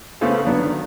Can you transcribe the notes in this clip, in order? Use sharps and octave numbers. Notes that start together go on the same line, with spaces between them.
C#3 A3 B3 G#4 A4 C5
F#3 B3 D4
D#3